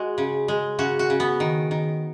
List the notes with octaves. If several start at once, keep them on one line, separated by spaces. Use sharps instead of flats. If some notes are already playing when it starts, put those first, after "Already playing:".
Already playing: G#3 F#4
C#3
G#3
C#3 F#4
F#4
C#3
B3
D#3
D#3